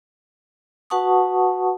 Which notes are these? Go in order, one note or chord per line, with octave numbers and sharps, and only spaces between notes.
F#4 B4 F#5 A5 C#6 D#6